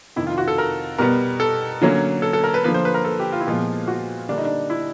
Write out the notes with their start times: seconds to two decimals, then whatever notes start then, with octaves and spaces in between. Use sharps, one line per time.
0.16 F2 C3 D#3 E4
0.27 F4
0.38 F#4
0.48 A4
0.58 A#4
0.98 B2 G3 B3 A#4
1.40 A4
1.82 D3 F#3 A#3 C#4
2.22 A4
2.33 A4
2.44 A#4
2.54 B4
2.64 D3 F3 A#3 B4
2.74 C5
2.85 B4
2.94 A#4
3.05 A4
3.20 G4
3.32 F4
3.41 E4
3.47 A#2 F3 G#3 B3 F4
3.88 F#4
4.29 D3 G3 A#3 D4
4.38 D#4
4.45 D4
4.70 E4